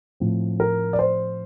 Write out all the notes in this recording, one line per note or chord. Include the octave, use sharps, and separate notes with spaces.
A2 F3 C4
A#4
D5
C5